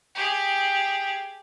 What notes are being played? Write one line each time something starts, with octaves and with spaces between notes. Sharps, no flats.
G4 G#4